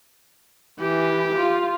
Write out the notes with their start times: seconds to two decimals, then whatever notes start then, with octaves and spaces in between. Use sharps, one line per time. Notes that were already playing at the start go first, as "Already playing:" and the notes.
0.79 E3 G4
1.35 F4